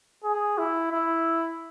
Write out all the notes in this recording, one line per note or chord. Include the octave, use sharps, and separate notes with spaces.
G#4
E4
E4